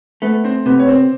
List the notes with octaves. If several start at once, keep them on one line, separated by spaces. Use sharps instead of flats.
A3 B3 B4
C4 C5
C3 B3 B4
C#5
C4 C5